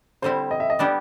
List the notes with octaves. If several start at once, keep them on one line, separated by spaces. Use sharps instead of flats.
D3 G3 C4 E4 C5
D#5
E5
D#5
G3 B3 D4 G4 D5